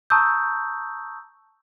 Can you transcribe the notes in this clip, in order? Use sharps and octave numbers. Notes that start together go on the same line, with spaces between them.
A5 A#5 C#6 D#6 E6 G6